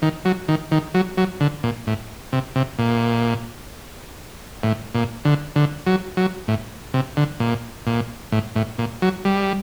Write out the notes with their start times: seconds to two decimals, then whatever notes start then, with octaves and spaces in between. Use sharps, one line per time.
0.02 D#3
0.25 F#3
0.48 D#3
0.72 D#3
0.94 F#3
1.17 F#3
1.41 D3
1.64 A#2
1.87 A2
2.33 C3
2.56 C3
2.79 A#2
4.63 A2
4.95 A#2
5.25 D3
5.56 D3
5.87 F#3
6.17 F#3
6.48 A2
6.94 C3
7.17 D3
7.40 A#2
7.87 A#2
8.32 A2
8.56 A2
8.79 A#2
9.02 F#3
9.25 G3